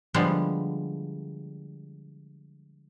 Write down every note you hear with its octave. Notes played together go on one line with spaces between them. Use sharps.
D3 F3 G3 G#3 B3